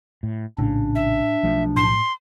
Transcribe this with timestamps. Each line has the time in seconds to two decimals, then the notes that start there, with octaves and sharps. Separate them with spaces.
0.23 A2
0.59 A#1 A2 C#3 D4
0.95 E5
1.43 B1 F3 A3
1.76 A2 C6